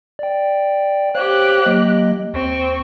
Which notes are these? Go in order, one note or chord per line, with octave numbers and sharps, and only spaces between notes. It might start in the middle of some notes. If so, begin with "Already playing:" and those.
D5 G5
G4 C5 C#5 F5 F#6
F#3 A#3 D#5
D#2 C4 C#6